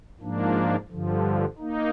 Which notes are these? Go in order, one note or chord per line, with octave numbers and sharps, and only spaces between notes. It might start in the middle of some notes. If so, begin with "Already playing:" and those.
G#2 F3 A#3 D4
G2 D3 F3
A#3 D#4